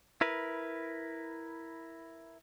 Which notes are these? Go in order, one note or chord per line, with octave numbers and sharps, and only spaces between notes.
E4 A#4 B4